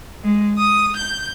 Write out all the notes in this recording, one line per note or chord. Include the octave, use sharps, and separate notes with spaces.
G#3
D#6
G6